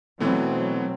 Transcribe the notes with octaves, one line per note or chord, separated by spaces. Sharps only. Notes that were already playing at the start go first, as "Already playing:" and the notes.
B2 E3 F#3 A3 B3 C4